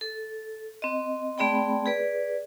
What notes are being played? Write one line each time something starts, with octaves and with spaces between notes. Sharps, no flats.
A4
C4 D#5
A3 C4 G#4 D5 G5 B5
G#4 B4 D5